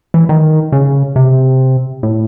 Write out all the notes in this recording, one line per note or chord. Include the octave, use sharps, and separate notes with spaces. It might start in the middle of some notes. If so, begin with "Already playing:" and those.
E3
D#3
C#3
C3
A2